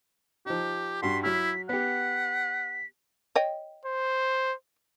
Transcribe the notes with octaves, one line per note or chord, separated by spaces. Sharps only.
F3 D#4 G4
G2 F#4 C6 B6
F#3 E4 F6 B6
B3 G4 F#5 B6
C#5 D#5 G5
C5